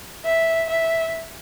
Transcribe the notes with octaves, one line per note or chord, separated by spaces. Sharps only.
E5
E5